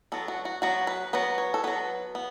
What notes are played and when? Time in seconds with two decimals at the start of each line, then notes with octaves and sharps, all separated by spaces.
0.12 F#3 B3 A4
0.28 F#4
0.45 F#4
0.62 F#3 B3 F#4
0.87 B4
1.13 F#3 B3 B4
1.38 C#5
1.54 A4
1.64 F#3 B3 B4
2.15 B3